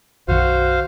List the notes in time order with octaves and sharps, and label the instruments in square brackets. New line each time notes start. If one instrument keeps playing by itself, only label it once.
[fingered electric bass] B1 F#2 D#3 [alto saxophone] F#4 [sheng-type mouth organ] C5 F5